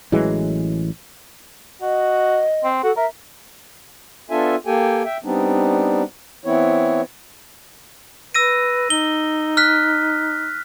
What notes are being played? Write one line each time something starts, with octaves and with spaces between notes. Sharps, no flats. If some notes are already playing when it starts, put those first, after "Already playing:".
A1 E3 F#3 G#3
F#4 D#5
C4
F#4 A4
A#4 E5
B3 D4 F4 A4 E5 G#5
A#3 G4 A4 G5 G#5
E5 G5
G3 B3 C4 D4 D#4
E3 B3 C4 E4 C#5
B4 E6 A#6 D#7
D#4 G7
F6 F#6 B6